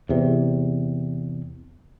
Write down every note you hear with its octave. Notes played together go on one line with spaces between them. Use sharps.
E2 C3